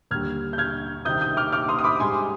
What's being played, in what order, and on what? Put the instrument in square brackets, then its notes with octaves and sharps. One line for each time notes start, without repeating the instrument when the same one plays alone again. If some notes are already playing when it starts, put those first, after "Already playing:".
[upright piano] D#2 D3 G3 F6 G#6
G6
F6 G#6
C2 C3 D#3 G3 D#6 G6
D#6 G6
D6 F6
D6 F6
C6 D#6
D#6
B5 D6
G#2 G#5 C6
G3